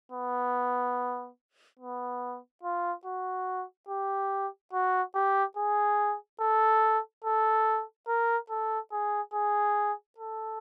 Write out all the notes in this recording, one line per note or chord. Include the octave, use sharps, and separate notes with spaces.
B3
B3
F4
F#4
G4
F#4
G4
G#4
A4
A4
A#4
A4
G#4
G#4
A4